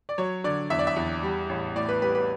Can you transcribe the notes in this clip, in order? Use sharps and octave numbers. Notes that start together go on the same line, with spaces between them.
D5
F#3 C#5
D3 D5
E2 E5
D5
E5
E2
G3
A1
A2 D5
B4
G3 B4
B4